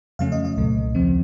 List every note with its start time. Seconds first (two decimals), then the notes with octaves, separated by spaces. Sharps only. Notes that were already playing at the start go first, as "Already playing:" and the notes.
0.19 F2 C#3 F#3 A3 C#4 F5
0.32 D#5
0.45 D#5
0.57 C2 A#2 A3
0.95 D#2 C#3 F3 C4